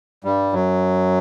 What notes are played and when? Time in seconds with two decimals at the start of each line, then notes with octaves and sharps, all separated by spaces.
0.24 G2 G3
0.53 F#2 F#3